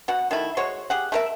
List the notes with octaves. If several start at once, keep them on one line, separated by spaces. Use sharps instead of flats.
B2 F#4 F#5
D#3 A3 E4
G#3 F#4 C5 C#5
G4 G#4 F#5
A3 A#4 E5